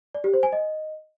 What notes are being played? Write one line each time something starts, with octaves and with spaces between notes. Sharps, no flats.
D5
G4
C5
G#5
D#5